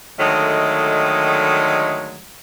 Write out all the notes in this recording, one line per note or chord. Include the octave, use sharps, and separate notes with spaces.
D3 D#3 F#3 G#3 A3